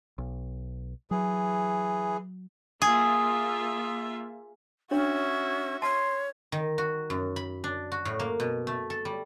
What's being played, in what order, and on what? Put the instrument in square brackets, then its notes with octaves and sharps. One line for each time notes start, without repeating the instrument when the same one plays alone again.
[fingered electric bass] B1
[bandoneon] E3 G#4 [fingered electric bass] F#3
[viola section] A#3 F4 E5 [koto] G#4 [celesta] D#6
[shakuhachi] C#4 [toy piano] D4 C#5 [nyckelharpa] F#4 E5
[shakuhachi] C#5 [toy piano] A5 [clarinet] C6
[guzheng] D#3
F#4
F#2
B5
D4
F#4
A2
A#3
B2
A3
A4
G3